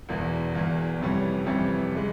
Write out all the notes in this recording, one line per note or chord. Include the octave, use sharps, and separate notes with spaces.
E1 E2 E3
E1 E2 E3
F2 C3 E3 G3 C#4
F2 C3 E3 G3 C#4
E3 G#3